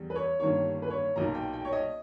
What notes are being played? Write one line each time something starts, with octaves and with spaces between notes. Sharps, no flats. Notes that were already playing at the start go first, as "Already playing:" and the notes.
Already playing: E2 G3
B4
C#5
G1 G2 D#3 A#3 C#5
B4
C#5
B1 A#2 A#3 A#5
G5
G5
C#5
D#5